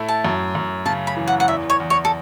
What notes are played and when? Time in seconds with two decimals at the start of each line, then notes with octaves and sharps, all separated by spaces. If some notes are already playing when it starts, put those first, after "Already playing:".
Already playing: A2 A3 E4
0.08 A5
0.25 F#2
0.55 F#2
0.86 C#3 A5
1.07 B5
1.17 E3
1.27 F#5
1.40 F#5
1.48 E2 E5
1.70 C#5
1.80 E2
1.90 C#5
2.05 A4